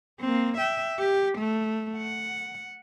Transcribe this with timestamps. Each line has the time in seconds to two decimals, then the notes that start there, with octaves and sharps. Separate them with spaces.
0.20 A#3 C4
0.58 E5 G5
0.99 G4
1.38 A3
1.97 F#5